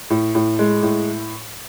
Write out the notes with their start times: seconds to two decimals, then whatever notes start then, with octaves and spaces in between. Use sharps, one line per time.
0.10 A2
0.35 A2
0.59 G#3
0.83 A2